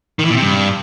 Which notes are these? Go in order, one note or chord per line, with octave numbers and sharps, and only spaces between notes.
D#3
E3
A#2
C3
G2